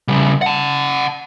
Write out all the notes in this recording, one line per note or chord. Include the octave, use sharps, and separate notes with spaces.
C#3 G3
F#5 A5